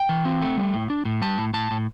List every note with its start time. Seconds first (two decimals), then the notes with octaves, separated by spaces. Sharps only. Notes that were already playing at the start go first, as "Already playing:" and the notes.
Already playing: G5
0.09 E3
0.25 C4
0.42 A3
0.57 G3
0.74 A2
0.90 D4
1.05 A2
1.22 G3 A5
1.38 A2
1.54 A2 A5
1.71 A2